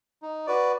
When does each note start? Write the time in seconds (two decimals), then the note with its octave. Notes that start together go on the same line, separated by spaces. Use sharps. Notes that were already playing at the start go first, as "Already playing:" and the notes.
0.22 D#4
0.47 F#4 B4 D5